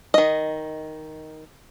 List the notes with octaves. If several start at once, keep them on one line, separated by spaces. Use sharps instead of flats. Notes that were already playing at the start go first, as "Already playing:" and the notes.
D#3 D#5